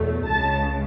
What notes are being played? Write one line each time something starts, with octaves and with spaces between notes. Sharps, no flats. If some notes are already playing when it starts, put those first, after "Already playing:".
Already playing: E2 B2 F#3 A3
C#2 C#3 G#3 A5